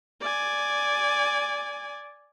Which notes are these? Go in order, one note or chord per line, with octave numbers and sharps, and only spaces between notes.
D5 G#5